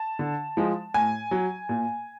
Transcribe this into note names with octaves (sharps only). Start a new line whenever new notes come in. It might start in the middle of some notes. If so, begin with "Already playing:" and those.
Already playing: A5
D3
F3 G#3
A2 G#5
F#3
A#2